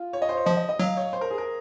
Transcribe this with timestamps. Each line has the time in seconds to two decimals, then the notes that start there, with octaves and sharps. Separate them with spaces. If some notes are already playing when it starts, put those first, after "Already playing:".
Already playing: F4
0.13 C#5
0.22 D#5
0.29 C5
0.37 C#5
0.46 F3 D#5
0.57 D#5
0.69 D#5
0.79 F#3 F5
0.97 C#5
1.13 C5
1.21 A#4
1.30 G#4
1.38 A#4